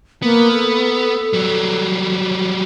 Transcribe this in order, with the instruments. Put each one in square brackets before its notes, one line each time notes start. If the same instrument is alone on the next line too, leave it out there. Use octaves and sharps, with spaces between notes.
[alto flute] A#3 [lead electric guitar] B3
[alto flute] A4
[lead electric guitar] F#3 G3